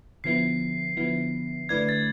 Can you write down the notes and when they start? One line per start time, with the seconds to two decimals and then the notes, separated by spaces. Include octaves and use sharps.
0.24 D3 F3 B3 E4 C7
0.97 D3 F3 B3 E4
1.69 D3 A3 E4 B4 D5 G#6
1.89 A6